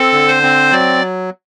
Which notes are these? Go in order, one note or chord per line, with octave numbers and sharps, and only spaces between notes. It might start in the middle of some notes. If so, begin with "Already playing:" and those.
Already playing: C4 A4
D3
C5
C4
F#3 D5